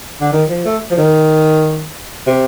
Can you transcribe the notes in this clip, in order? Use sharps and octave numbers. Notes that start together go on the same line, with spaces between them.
D3
D#3
F3
A3
F3
D#3
C3